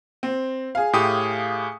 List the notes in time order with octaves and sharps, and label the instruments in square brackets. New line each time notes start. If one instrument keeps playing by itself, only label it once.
[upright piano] C4
G#4 F5
[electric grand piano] A2 G4 D#6